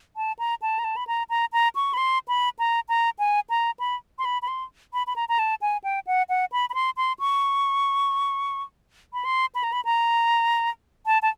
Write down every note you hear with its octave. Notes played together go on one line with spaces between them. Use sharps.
A5
A#5
A5
A#5
A5
B5
A#5
A#5
A#5
C#6
B5
C6
B5
A#5
A#5
G#5
A#5
B5
C6
B5
B5
C6
B5
B5
A#5
A#5
A5
G#5
G5
F#5
F#5
B5
B5
C6
C6
C#6
B5
C6
B5
A#5
B5
A#5
A5
A5